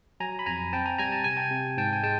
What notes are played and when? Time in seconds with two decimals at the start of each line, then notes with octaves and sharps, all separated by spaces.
0.20 F#3 G#5 A#5
0.39 B5
0.46 F2 G#5 A#5
0.73 C4 G5 A5
0.86 G#5 A#5
0.98 G3 G#5 A#5
1.12 A5
1.24 C3 G#5
1.37 G5 A5
1.51 C3
1.77 G#2 G5 A5
1.93 G#5
2.03 G#3 G5 A5